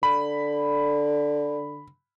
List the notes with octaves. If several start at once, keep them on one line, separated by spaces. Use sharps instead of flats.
D3 B5